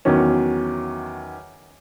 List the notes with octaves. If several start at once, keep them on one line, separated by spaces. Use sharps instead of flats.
E2 D#3 F#3 C#4